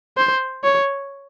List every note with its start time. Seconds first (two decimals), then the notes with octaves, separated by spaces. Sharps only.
0.18 C5
0.64 C#5